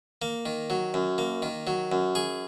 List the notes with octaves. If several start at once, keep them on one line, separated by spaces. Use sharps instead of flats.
A#3
D#3
F#3
F#2
A#3
D#3
F#3
F#2
G#4